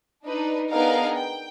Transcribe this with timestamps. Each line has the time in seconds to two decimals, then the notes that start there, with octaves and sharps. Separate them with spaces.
0.25 D4 D#4 B4
0.70 B3 D4 D#4 G#4 A#4 F5
1.16 G5